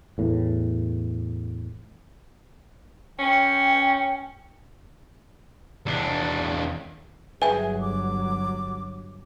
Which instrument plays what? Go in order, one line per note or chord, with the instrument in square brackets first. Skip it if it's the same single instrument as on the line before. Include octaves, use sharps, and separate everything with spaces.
[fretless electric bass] E2 A2
[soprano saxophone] C#4 [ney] G5
[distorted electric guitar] E2 D4
[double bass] G1 F#3 [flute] G#4 [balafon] B4 E5 [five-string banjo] G#5
[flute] D6